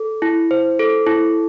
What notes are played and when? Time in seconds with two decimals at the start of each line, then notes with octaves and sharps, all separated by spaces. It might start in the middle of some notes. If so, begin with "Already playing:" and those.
Already playing: A4
0.22 E4
0.51 C5
0.79 A4
1.06 E4